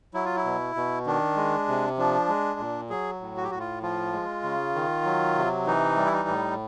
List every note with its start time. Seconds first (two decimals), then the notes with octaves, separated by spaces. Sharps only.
0.14 F#3 E4
0.25 F4
0.36 E4
0.45 B2
0.76 B2
1.06 D#3 D4
1.37 G#3
1.68 C3
1.98 F3 D4
2.29 G#3
2.59 A#2
2.90 F#3 G#4
3.21 A2
3.37 F#4
3.44 G4
3.51 A2 F#4
3.59 F4
3.82 F3 F4
4.13 G#3
4.43 C#3
4.75 D#3
5.05 F#3
5.36 C3
5.67 E3 D#4
5.97 G3
6.05 E4
6.13 D#4
6.28 A2